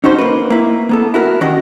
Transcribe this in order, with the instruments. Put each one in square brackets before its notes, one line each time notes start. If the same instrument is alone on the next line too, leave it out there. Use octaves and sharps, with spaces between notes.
[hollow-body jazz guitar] C#4 D#4 F#4 C5
A#3 B4
A#3 E4
A#3 B3 A4
E4 F#4 A#4
D#3 C#4 F#4 G4 D#5